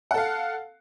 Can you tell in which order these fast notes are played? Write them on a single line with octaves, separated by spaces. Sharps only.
F#5 A4 F5